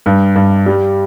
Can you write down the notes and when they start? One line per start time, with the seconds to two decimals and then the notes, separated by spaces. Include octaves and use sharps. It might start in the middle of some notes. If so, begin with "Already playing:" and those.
0.06 G2
0.36 G2
0.66 G3